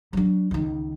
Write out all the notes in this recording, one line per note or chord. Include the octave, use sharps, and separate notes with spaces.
F#3 D4
C#2 D#3